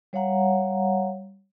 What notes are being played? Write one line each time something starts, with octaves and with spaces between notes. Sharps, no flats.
G3 C#5 F5 F#5 A#5